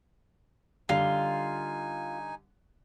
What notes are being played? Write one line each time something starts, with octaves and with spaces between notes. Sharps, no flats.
D3 G3 D#4 F4 G#5